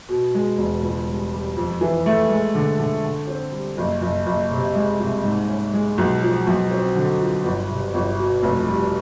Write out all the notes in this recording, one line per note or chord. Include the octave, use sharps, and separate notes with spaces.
B2
G#3
E1
C#2
G3
G3
F2
E3
A3
G#3
D3
D3
D3
C4
G3
F#1
F#1
F#1
C3
G#3
C2
G#2
C#4
G#3
B1
F3
B1
C4
D3
F4
G1
C3
G1
B2
F1
G3